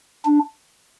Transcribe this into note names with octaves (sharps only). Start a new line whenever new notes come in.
D4